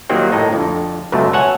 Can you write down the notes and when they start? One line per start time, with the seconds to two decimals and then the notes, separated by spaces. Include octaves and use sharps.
0.10 A#2 D#3 F#3 G3 A#3 C4
0.32 A2 D#4
0.53 F2 D3
1.12 C#2 F#2 B2 A3
1.33 C#5 E5 F#5 G#5 A5